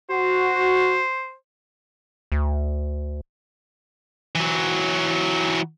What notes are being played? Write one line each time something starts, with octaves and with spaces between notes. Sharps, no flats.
F#4 C5
D2
E3 F#3